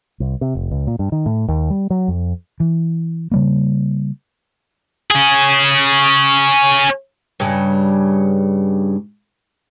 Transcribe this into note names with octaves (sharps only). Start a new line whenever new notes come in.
C2
C3
F1
C#2
A#2
G2
D#3
A2
D#2
G3
F#3
F2
E3
C#3 G3 A#3
C#4 G#4
G2 C#3